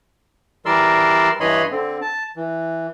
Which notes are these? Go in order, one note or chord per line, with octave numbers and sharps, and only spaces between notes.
E3 G3 A#4 D5 C6 E6
G2 E3 C#5 D#5 B5 C6
D3 C4
A5
E3